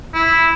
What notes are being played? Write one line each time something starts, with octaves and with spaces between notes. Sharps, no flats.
E4